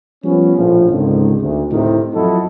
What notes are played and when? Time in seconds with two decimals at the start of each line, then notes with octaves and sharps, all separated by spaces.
0.25 F3 G3 B3 C#4
0.58 A#1 A2 F3
0.90 C#2 G#2 D3 D#3 C4
1.42 D2
1.72 A2 C3 D#3
2.15 F2 F#3 E4 F#4 A4 D#5